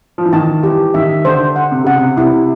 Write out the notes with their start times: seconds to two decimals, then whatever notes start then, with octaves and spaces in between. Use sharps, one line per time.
0.18 F3
0.25 E3
0.33 D#3 A5
0.63 E3 G4
0.94 D#3 E5
1.25 D3 C5
1.56 F#5
1.71 C3
1.84 C#3 F#5
1.98 C3
2.16 C3 E4